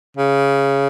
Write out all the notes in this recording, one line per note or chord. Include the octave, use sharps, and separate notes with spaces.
C#3